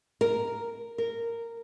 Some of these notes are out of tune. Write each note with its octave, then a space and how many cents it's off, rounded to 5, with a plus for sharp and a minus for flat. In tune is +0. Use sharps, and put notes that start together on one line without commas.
A#4 +0
A#4 -10